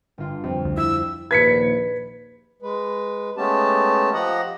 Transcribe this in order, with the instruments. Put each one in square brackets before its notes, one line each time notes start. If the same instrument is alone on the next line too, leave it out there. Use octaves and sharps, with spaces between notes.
[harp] G1 F4
[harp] F2 [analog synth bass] C3
[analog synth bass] D2
[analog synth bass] E4 [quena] E6
[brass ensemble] A#1 D#2 [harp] B4 [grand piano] G#6 B6 C#7
[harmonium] G#3 B4
G#3 A3 B3 C#4 G4 A5
F3 G4 D#5 F#5 A#5